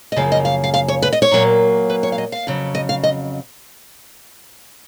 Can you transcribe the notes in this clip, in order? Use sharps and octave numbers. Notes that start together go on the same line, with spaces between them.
D#5
F#2 C#3 F3 A#3 F5
D#5
F5
F5
F5
C#5
B4
D#5
C#5
A#2 F#3 A#3
B4
C#5
F5
D#5
F5
F2 C#3 F#3
D#5
F5
D#5